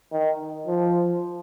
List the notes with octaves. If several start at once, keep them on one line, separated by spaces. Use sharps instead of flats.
D#3
F3